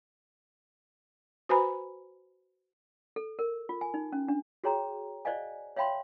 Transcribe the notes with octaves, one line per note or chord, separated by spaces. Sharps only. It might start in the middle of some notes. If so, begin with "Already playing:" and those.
F#4 B4 C5 G#5 A#5 B5
A4
A#4
F4
G#5
D#4
C#4
D4
F#4 G#4 C#5 G5 A#5
C5 D5 D#5 F5 G#5
C#5 E5 F5 G5 B5 C6